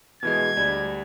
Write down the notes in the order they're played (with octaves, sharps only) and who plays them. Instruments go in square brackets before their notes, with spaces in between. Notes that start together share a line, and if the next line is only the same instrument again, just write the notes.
[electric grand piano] B2 E3 G#3 [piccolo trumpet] G#6
[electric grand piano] D2 G3